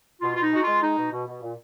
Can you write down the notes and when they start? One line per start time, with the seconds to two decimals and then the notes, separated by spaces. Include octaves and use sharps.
0.21 B2 F4
0.35 B2 F4
0.42 D#4
0.52 G#3 F#4
0.63 G#3 F4
0.82 G#3 D#4
0.98 B2
1.12 B2
1.27 B2
1.42 A#2